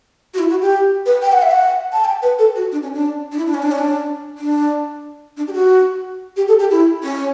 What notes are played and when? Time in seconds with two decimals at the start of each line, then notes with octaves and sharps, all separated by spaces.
0.34 F#4
0.39 E4
0.50 F#4
0.62 G4
1.06 B4
1.22 G5
1.32 F#5
1.42 E5
1.51 F#5
1.93 A5
2.05 G5
2.22 B4
2.39 A4
2.55 F#4
2.72 D4
2.82 C#4
2.94 D4
3.32 D4
3.38 E4
3.46 D4
3.54 C#4
3.63 D4
3.71 C#4
3.78 D4
4.38 D4
5.37 D4
5.48 G4
5.54 F#4
6.36 G4
6.48 A4
6.59 G4
6.71 E4
7.03 C#4